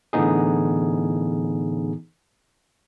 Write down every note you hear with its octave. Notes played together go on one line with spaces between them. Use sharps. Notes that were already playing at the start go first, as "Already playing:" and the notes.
A2 D3 E3 B3 D#4 G#4